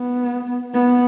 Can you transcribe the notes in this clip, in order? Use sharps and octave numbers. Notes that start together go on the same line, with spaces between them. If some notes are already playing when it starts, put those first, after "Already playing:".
Already playing: B3
B3